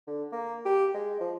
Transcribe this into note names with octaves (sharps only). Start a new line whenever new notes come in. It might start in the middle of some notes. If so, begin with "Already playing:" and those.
D3
A#3
G4
G#3
F3